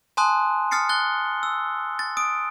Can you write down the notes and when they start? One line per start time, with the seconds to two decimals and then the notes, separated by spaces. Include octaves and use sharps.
0.17 G#5 A5 C6 D#6 F#6
0.71 D#6 F6 A6 C7 C#7
0.89 F#6 A6 G7
1.43 E6
1.99 A6
2.17 D#6 D7